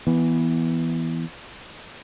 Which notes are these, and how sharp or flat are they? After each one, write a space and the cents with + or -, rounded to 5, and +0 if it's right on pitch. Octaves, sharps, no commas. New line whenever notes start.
E3 +0 B3 +0